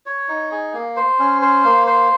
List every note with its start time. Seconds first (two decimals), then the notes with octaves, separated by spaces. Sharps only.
0.06 C#5
0.28 D#4
0.51 G#4
0.74 A#3
0.96 C5
1.19 C#4
1.41 C5
1.64 A#3
1.87 C5